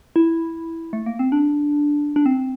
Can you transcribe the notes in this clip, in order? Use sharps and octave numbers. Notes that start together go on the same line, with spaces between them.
E4
A3
A#3
C4
D4
D4
C4